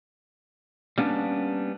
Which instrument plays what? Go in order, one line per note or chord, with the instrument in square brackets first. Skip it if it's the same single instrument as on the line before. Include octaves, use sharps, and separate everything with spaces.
[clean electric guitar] G3 A#3 B3 C#4 D4